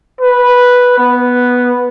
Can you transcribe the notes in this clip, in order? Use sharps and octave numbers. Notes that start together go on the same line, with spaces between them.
B4
B3